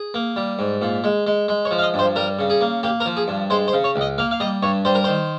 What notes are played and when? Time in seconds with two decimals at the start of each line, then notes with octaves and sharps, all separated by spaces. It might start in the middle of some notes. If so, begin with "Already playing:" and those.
Already playing: G#4
0.14 A#3
0.36 G3
0.59 G#2
0.82 A#2
1.04 G#3
1.27 G#3
1.48 G#3
1.65 C#5
1.71 F3
1.79 F5
1.82 D#5
1.94 G2
1.99 C5
2.16 G3 A#4
2.39 C#3
2.50 G#4
2.61 A#3
2.83 A#3 G4
3.00 A#4
3.06 F3
3.17 G#4
3.28 G2
3.50 G#3 C5
3.68 C5
3.73 C#3
3.84 C#5
3.96 C#2
4.01 D#5
4.18 A#3 F5
4.31 F5
4.40 G3 D#5
4.63 G2 C#5
4.85 G3 C5
4.95 A#4
5.04 D#3 C5